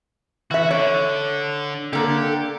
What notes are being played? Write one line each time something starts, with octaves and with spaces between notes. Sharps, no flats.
E3 F#4 E5
D3 C#5
D3 A#3 G4 A4